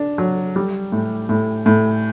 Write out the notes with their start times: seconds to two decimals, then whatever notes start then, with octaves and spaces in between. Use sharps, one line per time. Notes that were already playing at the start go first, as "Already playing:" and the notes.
Already playing: D4
0.18 F#3
0.56 G3
0.92 A2
1.29 A2
1.66 A2